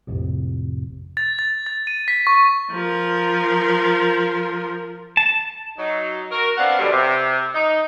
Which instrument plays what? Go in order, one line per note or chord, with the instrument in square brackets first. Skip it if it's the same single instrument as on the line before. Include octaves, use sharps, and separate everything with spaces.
[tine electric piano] A#1 F2 A2 C3
[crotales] A6
A6
A6
D#7
B6
C#6
[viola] F3 A#4
[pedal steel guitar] A5
[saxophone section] F#3 D#4
F#4 A#4
B3 C4 D4 F5 F#5
G2 B2 D3 F#3 G3
C3
D#4